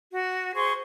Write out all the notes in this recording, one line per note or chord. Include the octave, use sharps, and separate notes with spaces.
F#4
G#4 C5 C6 C#6